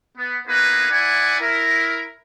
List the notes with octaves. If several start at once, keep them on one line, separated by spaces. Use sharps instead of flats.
B3
A#3 B3 D#4 E4 G#4 B4
E4 D5 F#5 G#5
E4 A#4